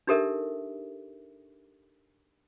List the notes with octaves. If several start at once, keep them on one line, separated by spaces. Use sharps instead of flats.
D4 D#4 G4 A4 A#4 E5